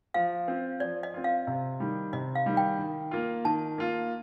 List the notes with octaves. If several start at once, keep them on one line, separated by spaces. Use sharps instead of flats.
F3 F5
C4 F4
F3 D5
D#5
C4 F4
F5
C3
D#3 G3
C3 D#5
F5
D#3 G3
G5
D#3
A#3 F4
D#3 A5
A#3 F4